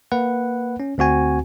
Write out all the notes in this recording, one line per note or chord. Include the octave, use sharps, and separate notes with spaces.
A#3 B4 F#5
C#4
D2 C4 F#4 G#5